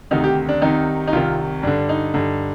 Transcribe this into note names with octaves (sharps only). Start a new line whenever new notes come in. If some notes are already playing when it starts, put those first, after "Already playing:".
D2 C3 D#3 D#4
G4
D4
C2 C3 D#3 D#4
D#4
C2 C3 D#3 F4
G2 D3 D4
D#4
G2 D3